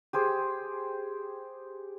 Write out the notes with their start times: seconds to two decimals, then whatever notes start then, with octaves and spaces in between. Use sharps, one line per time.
0.13 G4 G#4 C5